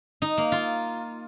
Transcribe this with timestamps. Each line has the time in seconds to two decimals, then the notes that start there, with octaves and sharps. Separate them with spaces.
0.22 D#4
0.38 A#3
0.52 F4